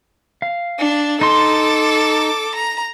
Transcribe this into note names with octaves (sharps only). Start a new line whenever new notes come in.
F5
D4
D#4 A4 C6 D6
A#5